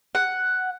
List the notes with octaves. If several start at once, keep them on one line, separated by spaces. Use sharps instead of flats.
F#5